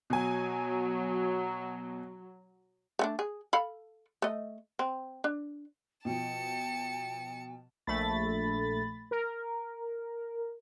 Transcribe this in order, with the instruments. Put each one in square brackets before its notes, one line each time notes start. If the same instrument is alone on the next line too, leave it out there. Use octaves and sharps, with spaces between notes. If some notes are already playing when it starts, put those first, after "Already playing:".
[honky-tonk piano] B2 G#5 [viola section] F#3
[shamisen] A3 C#4 D4
G#4
A4 F5 B5
A3 D#5
C4
D4
[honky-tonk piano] B2 F3 [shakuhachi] G5 [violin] A5 C#7
[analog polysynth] A#1 A3 B5 A6
A#4